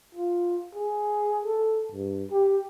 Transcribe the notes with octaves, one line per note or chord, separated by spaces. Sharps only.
F4
G#4
A4
G2
G4